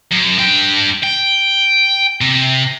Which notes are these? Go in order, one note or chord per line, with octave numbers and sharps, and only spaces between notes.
F#2
G2 G5
G5
C3